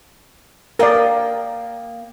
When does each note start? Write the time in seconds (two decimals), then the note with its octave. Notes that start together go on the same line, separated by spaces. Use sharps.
0.79 A#3 A#4 D5 G5 D#6